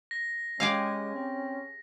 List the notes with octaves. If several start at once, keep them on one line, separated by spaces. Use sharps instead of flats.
A#6
G#3 C#4 G4 G#4 F5
C4